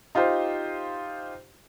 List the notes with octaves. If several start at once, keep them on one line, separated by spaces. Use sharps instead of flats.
D#4 F4 G4 C5